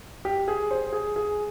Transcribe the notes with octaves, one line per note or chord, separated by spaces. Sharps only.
G4
G#4
C5
G#4
G#4